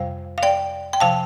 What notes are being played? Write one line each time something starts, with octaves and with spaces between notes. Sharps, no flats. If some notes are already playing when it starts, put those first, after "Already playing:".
Already playing: F2 C3 G3 C5 F5
F5
D5 G5
G5
C3 F3 F5 A5